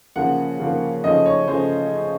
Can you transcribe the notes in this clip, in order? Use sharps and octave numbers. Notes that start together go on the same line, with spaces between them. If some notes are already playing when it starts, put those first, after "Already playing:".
C#3 F3 A#3 F#5
C#3 F3 A#3
C#3 F3 A3 C#4 D#5
C#5
C#3 F3 A3 C#4 C5